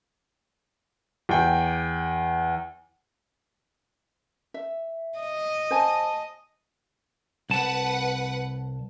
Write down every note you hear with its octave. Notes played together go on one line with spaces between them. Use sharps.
E2 G5
E5
D#5
C5 G#5 A5
C2 B4 F#5 A5